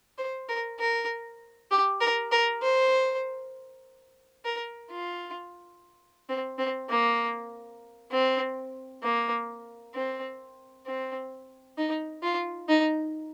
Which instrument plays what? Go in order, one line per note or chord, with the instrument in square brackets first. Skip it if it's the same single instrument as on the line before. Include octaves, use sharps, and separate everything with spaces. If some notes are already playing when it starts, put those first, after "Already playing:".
[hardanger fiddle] C5
A#4
A#4
G4
A#4
A#4
C5
A#4
F4
C4
C4
A#3
C4
A#3
C4
C4
D#4
F4
D#4